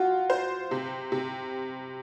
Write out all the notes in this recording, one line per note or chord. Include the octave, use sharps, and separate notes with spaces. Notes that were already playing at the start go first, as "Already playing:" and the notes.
Already playing: F#3 F4 F#4
C5
C3
C3